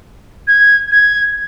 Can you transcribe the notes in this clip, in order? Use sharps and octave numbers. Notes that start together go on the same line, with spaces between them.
G#6
G#6